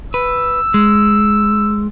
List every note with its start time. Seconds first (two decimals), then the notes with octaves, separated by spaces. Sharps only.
0.14 B4 E6
0.74 G#3